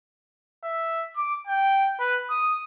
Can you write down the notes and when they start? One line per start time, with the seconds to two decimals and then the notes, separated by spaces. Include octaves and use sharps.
0.64 E5
1.16 D6
1.47 G5
1.99 B4
2.30 D#6